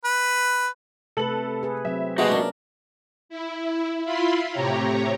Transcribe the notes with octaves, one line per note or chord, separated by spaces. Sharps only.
B4
C3 A3 A4 B4 F#7
G#4 B4
F#3 C4 E5
C3 E3 G#3 A#3 B3 F#4 D#5 F#5
C#4 D4 A#4
E4
E4 F4 B5 C6
A2 C3 G4 C#5 A#5